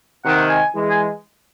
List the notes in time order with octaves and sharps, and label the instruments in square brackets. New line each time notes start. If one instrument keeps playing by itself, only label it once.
[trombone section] C3 D#3 [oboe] F#5
[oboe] G#5
[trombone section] E3 G#3
[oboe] G#5